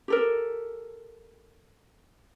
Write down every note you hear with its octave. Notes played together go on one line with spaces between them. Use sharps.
G4 A4 A#4